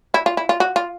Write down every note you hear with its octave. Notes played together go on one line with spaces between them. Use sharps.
E4
F4
E4
F4
F#4
F4